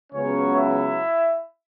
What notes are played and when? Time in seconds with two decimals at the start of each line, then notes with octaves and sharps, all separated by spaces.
0.13 C#2 C#3 F#3 B3 C#4 C#5
0.57 E4 E5